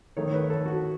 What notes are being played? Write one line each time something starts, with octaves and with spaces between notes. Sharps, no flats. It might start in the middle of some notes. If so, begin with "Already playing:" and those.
D#3 A3 C#5
C#5
B4
A4
F#4